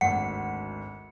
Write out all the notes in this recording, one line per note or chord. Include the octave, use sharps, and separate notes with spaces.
G#1 D2 F#5 C#7